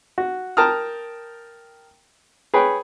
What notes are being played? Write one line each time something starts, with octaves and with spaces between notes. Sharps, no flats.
F#4
A#4 G5 A5 A#5 D#6 F6
G#4 B4 C#5 G5